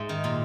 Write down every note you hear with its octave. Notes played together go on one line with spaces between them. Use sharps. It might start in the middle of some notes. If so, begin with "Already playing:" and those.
Already playing: G#2 E5
D#3
A#2